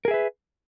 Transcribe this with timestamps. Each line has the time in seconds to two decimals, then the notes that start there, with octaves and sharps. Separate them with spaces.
0.05 A#4
0.08 G#4
0.11 E5
0.14 B4